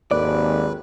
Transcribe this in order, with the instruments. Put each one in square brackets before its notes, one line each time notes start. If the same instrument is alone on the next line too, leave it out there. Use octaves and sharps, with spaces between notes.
[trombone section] G#1 [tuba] D#2 [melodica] B4 [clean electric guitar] D5